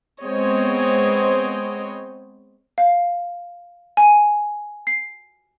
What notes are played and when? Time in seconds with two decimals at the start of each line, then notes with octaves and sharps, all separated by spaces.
0.22 G#3 B3 C4 C5 C#5 D#5
2.78 F5
3.97 G#5
4.87 C7